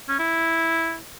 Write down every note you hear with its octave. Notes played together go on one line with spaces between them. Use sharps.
C#4
E4